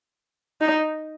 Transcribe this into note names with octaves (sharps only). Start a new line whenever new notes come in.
D#4